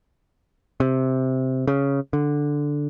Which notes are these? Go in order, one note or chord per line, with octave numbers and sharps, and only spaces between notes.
C3
C#3
D3